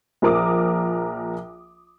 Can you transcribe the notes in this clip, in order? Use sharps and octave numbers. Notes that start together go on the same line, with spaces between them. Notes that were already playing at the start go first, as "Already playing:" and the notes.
A#1 F3 A#4 D6 D#6